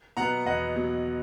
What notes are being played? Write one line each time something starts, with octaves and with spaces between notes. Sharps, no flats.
B2 F#3 B3 F#5 A#5
E2 D#5 F#5
B2 F#3 B3